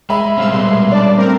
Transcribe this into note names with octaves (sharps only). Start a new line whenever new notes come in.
G#3 E5 B5
C3 G3 C#4 F5 E6
B2 G#3 C6
D4 D5 A5
A3 C4 A#4